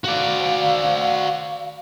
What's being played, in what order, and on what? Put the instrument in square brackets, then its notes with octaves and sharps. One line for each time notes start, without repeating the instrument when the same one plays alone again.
[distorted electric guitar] F#4 D5 [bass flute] F5